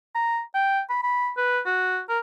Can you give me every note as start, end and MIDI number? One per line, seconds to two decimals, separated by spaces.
0.15 0.41 82
0.55 0.81 79
0.90 1.02 83
1.03 1.32 83
1.37 1.60 71
1.66 2.00 66
2.09 2.19 70